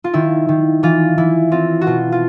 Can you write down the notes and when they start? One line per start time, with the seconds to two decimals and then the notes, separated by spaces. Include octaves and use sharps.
0.04 F4
0.13 D#3 E4
0.49 D#3
0.83 E3 F4
1.18 E3 E4
1.51 C4 F4
1.81 F#4
1.87 B2 F4
2.12 F4